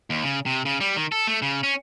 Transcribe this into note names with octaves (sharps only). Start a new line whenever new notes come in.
D#2
C#3
C3
C#3
G3
D#3
A4
A3
C#3
C#4